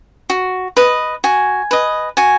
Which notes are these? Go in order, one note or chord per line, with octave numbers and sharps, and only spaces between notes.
F#4
B4 D#5
F#4 G#5
B4 D#5
F#4 G#5